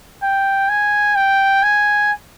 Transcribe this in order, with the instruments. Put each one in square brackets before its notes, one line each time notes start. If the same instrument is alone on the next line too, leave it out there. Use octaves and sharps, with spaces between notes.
[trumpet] G5
G#5
G5
G#5